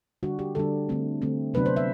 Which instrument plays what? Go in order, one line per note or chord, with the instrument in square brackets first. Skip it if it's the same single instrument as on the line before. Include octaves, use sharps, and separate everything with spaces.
[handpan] D3 G3 D4 F#4
G4
D3 G3 D4 A4
D3 A3 C4
D3 A3 C4
C3 F#3 B3 D4 B4
C5
E5